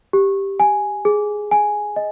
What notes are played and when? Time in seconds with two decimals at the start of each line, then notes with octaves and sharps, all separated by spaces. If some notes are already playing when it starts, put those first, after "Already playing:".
0.13 G4
0.60 G#5
1.05 G#4
1.51 G#5
1.96 D#5